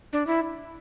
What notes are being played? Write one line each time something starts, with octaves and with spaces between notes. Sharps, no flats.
D4
E4